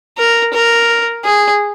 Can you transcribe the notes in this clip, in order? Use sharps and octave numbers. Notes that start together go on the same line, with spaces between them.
A#4
A#4
G#4